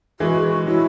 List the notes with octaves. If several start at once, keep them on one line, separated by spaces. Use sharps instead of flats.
E3 G#3 F#4
F#3 E4